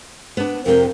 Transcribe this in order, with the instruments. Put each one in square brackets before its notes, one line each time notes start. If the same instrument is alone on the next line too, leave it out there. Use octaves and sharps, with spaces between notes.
[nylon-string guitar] B3 D4
[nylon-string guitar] F2 C3 G5 [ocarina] A#4